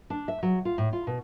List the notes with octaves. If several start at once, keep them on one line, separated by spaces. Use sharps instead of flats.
D4
E5
F#3
F4
A2
F4
B2